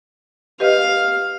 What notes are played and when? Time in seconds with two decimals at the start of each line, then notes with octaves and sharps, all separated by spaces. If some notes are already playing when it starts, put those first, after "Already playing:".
0.60 G4 B4 D#5 F5